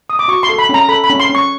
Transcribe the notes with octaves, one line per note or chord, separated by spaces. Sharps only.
D#6
D6
F#4 C#6
C6
A4
B5
C#4 A#5
A4 B5
B5
C#4
C6
C#4
C#6